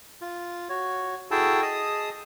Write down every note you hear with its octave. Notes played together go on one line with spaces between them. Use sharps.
F4
F#4 C#5
E4 F#4 G#4 A4 G5 A5
G#4 D#5 A5 D#6